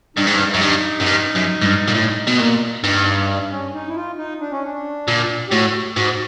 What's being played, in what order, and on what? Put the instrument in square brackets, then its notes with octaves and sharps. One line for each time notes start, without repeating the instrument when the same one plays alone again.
[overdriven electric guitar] G2 [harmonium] D#4
[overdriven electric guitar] G#2
G2
F#2
[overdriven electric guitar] G2 [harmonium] D#4
[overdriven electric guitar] F#2
G2
F#2
G#2
G2
A#2
A2
B2
A#2
[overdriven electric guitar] G2 [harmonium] D#4
[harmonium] D#4
D4
D4
C#4
D#4
E4
F4
D#4
D4
C#4
D4
[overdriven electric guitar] A#2
[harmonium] G4
[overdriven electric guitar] A2 [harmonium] F#4
[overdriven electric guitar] G#2 [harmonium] F#4